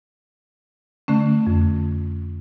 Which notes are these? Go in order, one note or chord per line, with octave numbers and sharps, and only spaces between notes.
D3 A3 C#4
F2